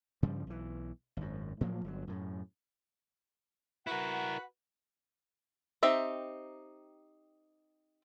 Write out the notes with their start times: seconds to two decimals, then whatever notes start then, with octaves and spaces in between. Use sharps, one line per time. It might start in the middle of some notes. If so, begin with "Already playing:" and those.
0.22 G2 C#3 F3 G3
0.47 B1 E3
1.17 G#1 F#2
1.61 A2 F3 F#3 A#3
1.84 G1 D3 F#3
2.07 F#2 A2
3.87 E4 F#4 A#4 B4 F#5
5.83 C4 D#4 G4 E5 A#5